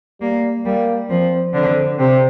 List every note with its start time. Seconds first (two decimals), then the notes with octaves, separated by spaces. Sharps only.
0.22 G3 A#3
0.65 G3 A#3
1.10 F3 C4
1.54 D3 C4
1.99 C3 C4